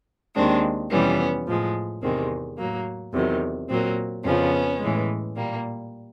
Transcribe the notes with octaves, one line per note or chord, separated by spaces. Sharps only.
D#2 D#3 G#3 C4 D4
F2 C3 E3 G3 B3 C#4
A2 F3 G#3
E2 C3 D#3 G#3 C4
A2 F#3 A#3
E2 C3 D#3 F#3
A#2 F#3 A#3 C4
F2 C#3 F3 B3 C#4
A2 E3 G#3
A#2 G3 A#3